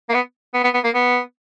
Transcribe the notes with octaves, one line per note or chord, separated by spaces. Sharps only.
A#3
B3
B3
B3
B3
A#3
B3